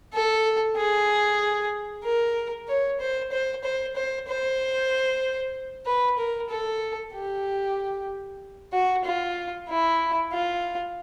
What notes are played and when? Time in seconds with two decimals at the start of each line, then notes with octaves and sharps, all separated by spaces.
0.14 A4
0.77 G#4
2.04 A#4
2.68 C#5
3.00 C5
3.32 C5
3.64 C5
3.96 C5
4.28 C5
5.86 B4
6.18 A#4
6.50 A4
7.14 G4
8.73 F#4
9.05 F4
9.69 E4
10.32 F4